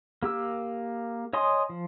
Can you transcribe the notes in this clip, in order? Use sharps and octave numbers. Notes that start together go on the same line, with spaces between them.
A#3 G4 E6
C#5 D#5 G#5 C6 D#6
F3